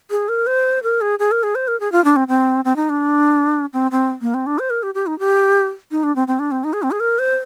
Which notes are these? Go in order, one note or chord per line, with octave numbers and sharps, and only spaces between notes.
G#4
A#4
C5
A#4
G#4
G#4
A#4
G#4
C5
A#4
G#4
F4
D4
C4
C4
C4
D#4
D4
C4
C4
A#3
C4
D4
C5
A#4
G4
G4
D#4
G4
D#4
D4
C4
C4
D4
C4
D#4
G#4
C4
G#4
A#4
C5